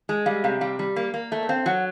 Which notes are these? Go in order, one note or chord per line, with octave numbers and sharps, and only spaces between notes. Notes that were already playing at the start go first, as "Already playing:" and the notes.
G#3
G3 F5
C3 F5
G3 F5
G3
A#3
A#3
A3 E5
E5
C4 F5
F#3 F#5